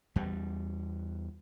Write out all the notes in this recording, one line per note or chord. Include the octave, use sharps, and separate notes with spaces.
E2 G3